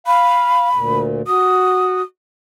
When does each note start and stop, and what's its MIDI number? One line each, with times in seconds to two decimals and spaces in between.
0.07 0.69 77
0.07 1.00 83
0.74 1.22 38
0.74 1.22 46
1.27 2.02 66
1.27 2.02 87